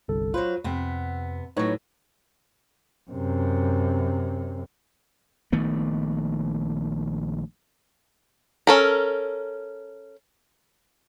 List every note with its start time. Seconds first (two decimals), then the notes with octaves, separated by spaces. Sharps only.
0.08 G1 C2 A4
0.34 F#3 F4 B4 C5
0.64 F2 C3 B3
1.57 A2 F#3 D#4 B4 C#5
3.11 F#2 C3
5.52 A#1 D#3 A3 B3
8.67 C#4 A4 A#4